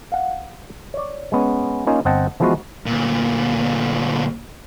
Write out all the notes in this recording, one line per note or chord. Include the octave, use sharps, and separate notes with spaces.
F5 F#5
C#5 D5
G#3 B3 C#4
A#3 C#4 D#4 F4 G#5
G1 C4 D#5 F#5 G5 A5
E3 F3 G#3 B3 F4 F#4
D2 A#2